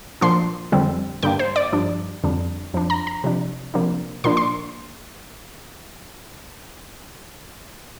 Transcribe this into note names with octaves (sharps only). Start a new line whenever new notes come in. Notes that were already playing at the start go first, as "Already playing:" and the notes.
A#2 F3 A#3 D4 C6
F2 D3 G3 C4
G2 D3 A#3 D4 G5
C5
D5
G2 F3 D4
F2 D3 G3 D4
F2 F3 D4
A#5
A#5
C3 F3 D4
C3 F3 A#3 D4
A#2 F3 A#3 D4 C6
C6